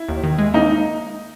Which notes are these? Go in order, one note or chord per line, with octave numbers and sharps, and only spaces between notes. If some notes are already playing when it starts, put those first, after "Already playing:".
Already playing: E4
D#2
D#3
G#3
A#3 D#4